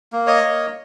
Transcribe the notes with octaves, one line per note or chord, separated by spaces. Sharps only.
A#3
C#5 D#5
A#3